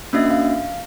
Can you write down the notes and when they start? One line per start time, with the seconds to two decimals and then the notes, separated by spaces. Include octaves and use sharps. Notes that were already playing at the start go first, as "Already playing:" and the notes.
0.13 A#3 C#4 D4 F#4 D#5 E5
0.31 F5